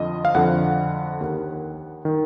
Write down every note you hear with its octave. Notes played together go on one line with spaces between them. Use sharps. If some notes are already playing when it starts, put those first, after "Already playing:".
Already playing: F2 D3 F3 D#5
F5
F2 D3 F3 F#5
D#2 D#3
D#3